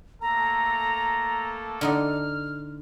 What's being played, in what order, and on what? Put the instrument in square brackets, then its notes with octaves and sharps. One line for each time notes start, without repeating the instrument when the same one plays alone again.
[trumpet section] A3 A#3 A4 [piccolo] A#5
[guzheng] D3 D#4 D#5 [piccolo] F6